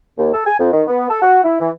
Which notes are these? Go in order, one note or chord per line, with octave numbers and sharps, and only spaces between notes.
D#2
A4
G#5
F2
D#3
B3
A4
F#4
E4
E3